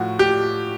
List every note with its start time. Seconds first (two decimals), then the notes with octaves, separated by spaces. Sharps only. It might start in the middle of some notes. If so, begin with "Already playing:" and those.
Already playing: A2 F3 F#4
0.19 G4